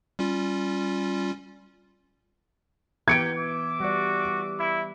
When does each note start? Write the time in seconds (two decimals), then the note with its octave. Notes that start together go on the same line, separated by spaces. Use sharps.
0.19 G3 C#4 F4
3.08 E3 A#3 B3 G4 G5 G#6 C#7 D7
3.37 E5 D6
3.80 G3 F#4 D5
4.59 E4